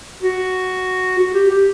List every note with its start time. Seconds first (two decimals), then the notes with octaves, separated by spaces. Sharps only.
0.23 F#4
1.18 F#4
1.34 G4
1.50 G4